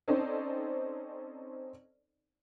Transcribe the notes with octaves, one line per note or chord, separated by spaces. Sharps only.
C4 C#4 D#4 A4 C5 D5